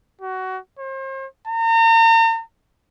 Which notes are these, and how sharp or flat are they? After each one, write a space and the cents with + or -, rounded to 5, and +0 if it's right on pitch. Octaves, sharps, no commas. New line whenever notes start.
F#4 +20
C5 +40
A#5 -40